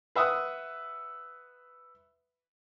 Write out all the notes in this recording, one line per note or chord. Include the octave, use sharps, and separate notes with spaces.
B4 E5 F#5 D#6